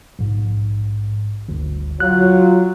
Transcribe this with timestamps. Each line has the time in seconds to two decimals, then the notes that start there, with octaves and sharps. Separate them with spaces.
0.19 A#1 G#2
1.49 G1 D2
2.00 F#3 F4 F#6